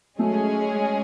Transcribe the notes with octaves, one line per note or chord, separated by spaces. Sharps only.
F#3 G#3 A3 C#4 G#4